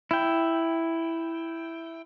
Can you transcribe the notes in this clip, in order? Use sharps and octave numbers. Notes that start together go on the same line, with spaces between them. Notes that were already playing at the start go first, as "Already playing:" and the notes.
E4 G5